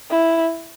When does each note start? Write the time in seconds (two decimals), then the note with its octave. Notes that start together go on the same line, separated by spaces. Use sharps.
0.11 E4